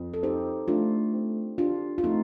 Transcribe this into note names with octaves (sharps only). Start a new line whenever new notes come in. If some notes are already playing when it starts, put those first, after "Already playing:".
Already playing: F2
A4
C4 D#4 G4
A3 D4 F4
C4
D4 F4 G4
F4
A3 C4 D#4